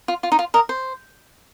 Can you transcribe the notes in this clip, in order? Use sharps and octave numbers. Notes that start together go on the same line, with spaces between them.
F4
F4
D#4
F4
A#4 D#5
C5